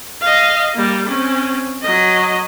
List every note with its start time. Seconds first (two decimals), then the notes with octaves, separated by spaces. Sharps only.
0.21 D#5 F5
0.74 G3 A#3
1.08 C4 C#4
1.81 F#3 D#5